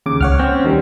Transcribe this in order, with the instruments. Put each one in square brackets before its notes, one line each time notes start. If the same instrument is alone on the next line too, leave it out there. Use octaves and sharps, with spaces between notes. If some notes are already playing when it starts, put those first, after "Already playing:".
[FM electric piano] D#2 C#3 D6
[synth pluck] C#2 [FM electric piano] C#5 F#5 F6
[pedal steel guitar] C4 C#4
[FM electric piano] D#2 D#3 G3